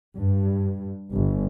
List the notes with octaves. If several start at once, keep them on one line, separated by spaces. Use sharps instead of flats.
G2
G1